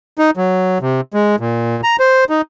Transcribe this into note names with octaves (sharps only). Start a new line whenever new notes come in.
D#4
F#3
C3
G#3
A#2
A#5
C5
D#4